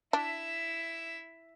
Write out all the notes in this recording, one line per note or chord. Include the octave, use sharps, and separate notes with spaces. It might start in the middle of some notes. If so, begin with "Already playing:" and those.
D4 E4 E5